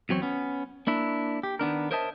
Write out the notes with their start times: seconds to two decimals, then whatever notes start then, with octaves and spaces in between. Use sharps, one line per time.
0.09 E2 F#3 C4 C#5
0.22 B3 C#4
0.87 A#3 D4 E4
1.43 G4
1.59 D#3 B3 D4 A#4
1.91 A#4 C5 C#5 D#5 E5 A5